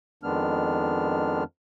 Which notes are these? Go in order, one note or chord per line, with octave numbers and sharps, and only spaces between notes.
F2 D#3 G#3 B3 D4 F6